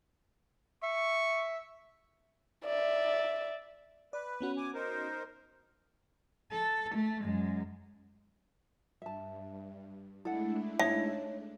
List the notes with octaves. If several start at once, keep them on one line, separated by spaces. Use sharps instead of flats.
E5 C#6
D5 E5
B4 D5
B3 C#4 F#4
G#5 D6
D#4 A#4 C5
A4
A3
F#2 G#3
G2 E5 A5
G#3 A3 D4 E4 A4 F#5
D#4 C#5 E5 A5